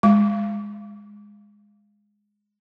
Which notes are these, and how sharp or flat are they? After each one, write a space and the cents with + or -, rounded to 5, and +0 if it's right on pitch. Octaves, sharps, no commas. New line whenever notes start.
G#3 -10 D6 -40